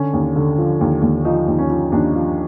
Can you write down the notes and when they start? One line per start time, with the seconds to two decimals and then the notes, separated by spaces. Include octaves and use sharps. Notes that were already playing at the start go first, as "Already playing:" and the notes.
Already playing: D3 C#4
0.13 D#2
0.36 D3
0.58 F3
0.81 D#2
1.02 D#2
1.25 F3 D#4
1.47 D#2
1.59 C#4
1.70 F3
1.92 D#2 D4
2.14 F3